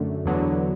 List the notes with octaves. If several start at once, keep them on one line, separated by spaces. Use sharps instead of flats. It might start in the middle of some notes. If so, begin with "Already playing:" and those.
Already playing: F#2 D3 A3
E2 D3 F#3 B3